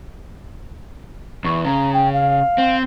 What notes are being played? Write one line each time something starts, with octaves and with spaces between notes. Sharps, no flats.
E2 C#6
C#3 A#5
G5
F5
C4